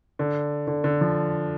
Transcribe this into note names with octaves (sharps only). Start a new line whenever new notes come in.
D3
D3
D3
F3